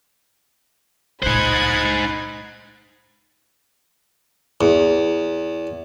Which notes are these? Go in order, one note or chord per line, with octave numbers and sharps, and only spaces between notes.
C#2 A#2 D#4 C5 B5 F#6 G#6
E2